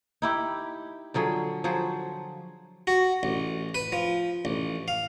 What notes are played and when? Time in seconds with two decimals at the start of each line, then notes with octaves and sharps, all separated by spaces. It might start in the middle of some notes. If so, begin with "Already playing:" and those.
0.22 D#4 E4 G4
1.14 D3 F3 F#3 G#4
1.64 F3 F#3 G#4 C5
2.87 F#4
3.23 A1
3.75 B4
3.92 F3
4.45 A1
4.88 F5